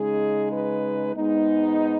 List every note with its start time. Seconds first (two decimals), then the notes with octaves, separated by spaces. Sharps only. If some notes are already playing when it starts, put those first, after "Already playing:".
Already playing: C#3 G#3 D#4 G#4
0.52 B4
1.14 G#2 G#3 B3 D#4